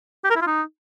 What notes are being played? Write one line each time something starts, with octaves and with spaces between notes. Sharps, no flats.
G4
A#4
E4
F4
D#4